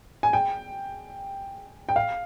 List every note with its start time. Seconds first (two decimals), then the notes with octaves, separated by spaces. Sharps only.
0.23 G#5
0.33 G5
1.89 G5
1.96 F5